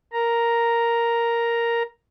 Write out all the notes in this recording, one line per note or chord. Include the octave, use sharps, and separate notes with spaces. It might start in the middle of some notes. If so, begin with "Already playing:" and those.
A#4 A#5